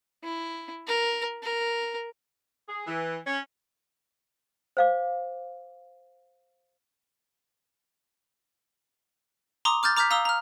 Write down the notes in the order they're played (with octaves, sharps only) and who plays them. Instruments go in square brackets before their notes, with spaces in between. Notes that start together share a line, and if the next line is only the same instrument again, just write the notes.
[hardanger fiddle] E4
A#4
A#4
[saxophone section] G#4
E3
C#4
[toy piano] C5 F5 D6
[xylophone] A#5 C6 D6 D#6
D6 F6 G6 A6
A#5 D6 F6 G6 B6
F5 A#5 D#6 E6 G7
A#5 F6